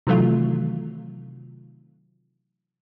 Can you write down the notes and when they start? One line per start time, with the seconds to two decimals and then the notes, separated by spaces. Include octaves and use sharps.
0.07 C3 D#3 E3 F#3 A3 F4